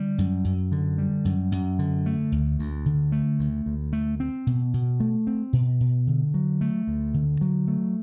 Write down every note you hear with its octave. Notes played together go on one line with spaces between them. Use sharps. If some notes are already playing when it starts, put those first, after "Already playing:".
Already playing: D3 G3
F#2
F#2
D3
G3
F#2
F#2
D3
A3
D2
D2
D3
A3
D2
D2
A3
C4
B2
B2
A3
C4
B2
B2
D3
F#3
A3
D2
D3
F#3
A3